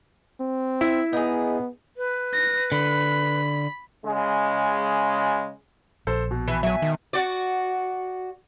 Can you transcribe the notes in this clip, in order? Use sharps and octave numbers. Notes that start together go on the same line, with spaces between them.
C4
E4 E5
B3 D#4 G#4
B4
A#6
D3 B5
C#3 G#3
A#1 A4 C5
B2
E3
F#3 E5 G#5
D#3
F#4 D5